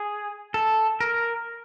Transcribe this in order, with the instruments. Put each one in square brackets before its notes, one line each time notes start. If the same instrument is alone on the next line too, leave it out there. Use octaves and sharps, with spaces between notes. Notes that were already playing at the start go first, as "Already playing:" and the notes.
Already playing: [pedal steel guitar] G#4
A4
A#4